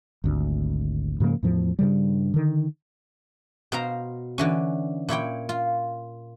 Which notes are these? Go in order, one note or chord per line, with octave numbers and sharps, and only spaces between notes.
G#1 D2
G#2 C#3 F3 A#3
E2 A2 F3
G2 C#3 G3
D3 D#3
B2 C5 F5 A#5
D3 E3 C#4
A#2 E4 C#5 G5
F4